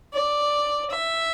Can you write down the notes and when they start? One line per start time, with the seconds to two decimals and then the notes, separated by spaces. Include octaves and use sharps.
0.14 D5
0.91 E5